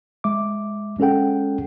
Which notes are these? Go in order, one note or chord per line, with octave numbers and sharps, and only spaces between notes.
G#3 E5 D6
G#3 C#4 G#4 A4 F#5 G5